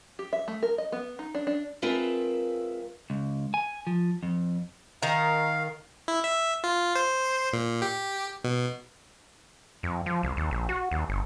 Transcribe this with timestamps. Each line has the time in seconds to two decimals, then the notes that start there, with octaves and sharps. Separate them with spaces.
0.19 G4
0.33 E5
0.48 A3
0.63 A#4
0.78 D#5
0.92 B3
1.19 D#4
1.35 D4
1.47 D4
1.82 G#3 C4 F4 A#4 B4 E5
3.10 C#2
3.54 G#5
3.87 F3
4.23 F2
5.03 D#3 A#4 F5
6.08 E4
6.24 E5
6.64 F4
6.96 C5
7.53 A#2
7.82 G4
8.44 B2
9.83 F2
10.06 F3
10.23 C2
10.37 D#2
10.51 A#1
10.69 F#4
10.91 D#2
11.09 G1